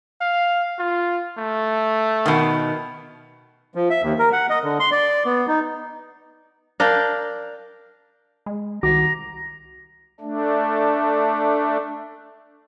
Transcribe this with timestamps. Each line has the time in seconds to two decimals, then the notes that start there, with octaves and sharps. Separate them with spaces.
0.21 F5
0.79 F4
1.38 A3
2.26 B2 D#3
3.75 F3
3.90 E5
4.02 D#2
4.19 A#4
4.33 F#5
4.50 D#5
4.63 D3
4.80 C6
4.92 D5
5.25 B3
5.48 D#4
6.80 D4 A#4 F5 G5
8.46 G#3
8.83 C2 D#3 F#4 A#5 D6
10.21 A3 D4